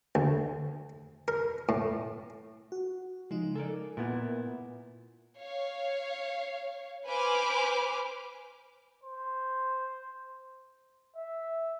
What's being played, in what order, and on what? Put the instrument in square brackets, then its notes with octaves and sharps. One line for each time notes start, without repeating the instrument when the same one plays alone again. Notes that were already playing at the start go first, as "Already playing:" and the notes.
[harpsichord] D2
A#4
A2
[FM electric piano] F#4
[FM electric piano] C#3 F3 D#4 [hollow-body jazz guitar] G#3
[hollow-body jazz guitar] A4 A#4 D5 [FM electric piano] G#5
[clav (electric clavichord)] A#2 B3 [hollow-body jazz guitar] E4 A#4
[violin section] C#5 F5
B4 C5 G#5 B5 D6 F6
[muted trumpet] C5
E5